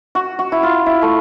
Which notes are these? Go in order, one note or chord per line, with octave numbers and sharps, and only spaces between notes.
F#4
F#4
E4
F4
E4
A3